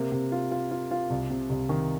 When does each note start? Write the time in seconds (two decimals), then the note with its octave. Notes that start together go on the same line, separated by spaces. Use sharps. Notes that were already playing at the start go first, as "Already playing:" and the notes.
Already playing: C3 A#3
0.12 C3
0.32 F4
0.51 F4
0.71 F4
0.91 F4
1.10 C2
1.30 C3
1.50 C2
1.69 D#3